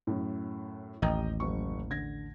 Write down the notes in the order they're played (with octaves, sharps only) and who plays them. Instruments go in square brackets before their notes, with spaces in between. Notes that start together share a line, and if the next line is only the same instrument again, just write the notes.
[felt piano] F#2 A2
[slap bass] A1 D#2 [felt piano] D#5 G5 A#5
[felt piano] F#1 F#2 C#6
D3 G#6 A#6